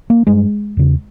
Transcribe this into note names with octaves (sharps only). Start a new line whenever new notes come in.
A#3
G2 G#3
E2 C#3